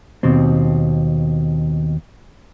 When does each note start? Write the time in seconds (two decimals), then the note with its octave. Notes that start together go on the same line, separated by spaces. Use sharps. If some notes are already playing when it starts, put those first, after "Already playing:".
0.23 D#2 B2 C4